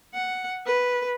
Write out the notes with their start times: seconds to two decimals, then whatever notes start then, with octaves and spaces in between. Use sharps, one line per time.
0.14 F#5
0.66 B4